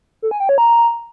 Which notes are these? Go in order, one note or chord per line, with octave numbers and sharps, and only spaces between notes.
A4
G#5
G5
C#5
A#5